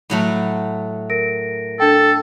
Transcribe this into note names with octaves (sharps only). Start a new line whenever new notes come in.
A2 F#3 A3
A#4 A#6 D7
D4 A4 G5